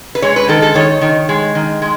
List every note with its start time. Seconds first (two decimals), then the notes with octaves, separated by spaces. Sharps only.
0.15 B4
0.22 G#3 C#5
0.36 B4
0.48 D#3 A4
0.62 A4
0.75 D#3 C#5
1.01 D#3
1.29 G#3
1.55 D#3
1.82 G#3